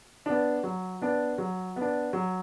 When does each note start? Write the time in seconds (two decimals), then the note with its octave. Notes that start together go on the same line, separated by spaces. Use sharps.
0.26 B3 D4
0.63 F#3
1.01 B3 D4
1.38 F#3
1.76 B3 D4
2.13 F#3